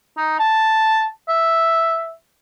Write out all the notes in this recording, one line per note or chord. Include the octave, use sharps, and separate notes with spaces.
D#4
A5
E5